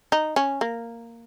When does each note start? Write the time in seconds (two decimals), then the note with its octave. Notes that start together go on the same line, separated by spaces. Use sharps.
0.12 D#4
0.36 C#4
0.61 A#3